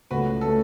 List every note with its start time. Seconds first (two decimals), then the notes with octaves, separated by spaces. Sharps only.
0.11 C#2 C#3 A3 F#4 B4
0.41 C#3 A3 A4